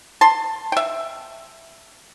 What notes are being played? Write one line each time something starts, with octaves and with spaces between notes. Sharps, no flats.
A5 C6
E5 G5